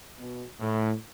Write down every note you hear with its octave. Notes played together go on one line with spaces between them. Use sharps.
B2
A2